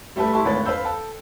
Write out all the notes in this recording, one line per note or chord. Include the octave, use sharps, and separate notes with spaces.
G3 A3 G4 A4 B4
E4 G4 A5 C6 C#6
G#1 D2 B4 C#5 A6
B4 C5 F5 B5 E6 G6
A4 G5 A5